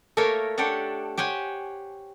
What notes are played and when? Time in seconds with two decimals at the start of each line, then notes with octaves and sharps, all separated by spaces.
0.17 A3 A#3 A#4 C#5 E5 F5
0.58 D4 G4 A4 C#5 F#5
1.18 G4 C5 C#5 F#5 G#5